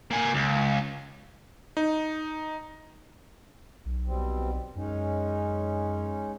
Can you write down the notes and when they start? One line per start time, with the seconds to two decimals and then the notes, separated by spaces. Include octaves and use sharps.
0.11 A#3 G#5
0.35 C#2
1.77 D#4
3.85 B1
4.05 B2 G3 C4
4.76 F#2 G#3 C#4 D#4